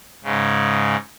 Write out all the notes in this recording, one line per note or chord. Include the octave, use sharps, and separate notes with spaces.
G#2 C#3